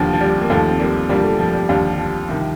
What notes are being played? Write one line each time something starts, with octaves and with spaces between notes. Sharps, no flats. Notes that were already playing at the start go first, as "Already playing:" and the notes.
Already playing: D#2 D3 F3
F3
G3
A#3
D#2 D#3 F3 A3
C4
G3 A#3
F2 D3 F3 G3 A#3
F3 A3
F3
G3
D#2 D3 F3 G3
F3
C2 C3 D#3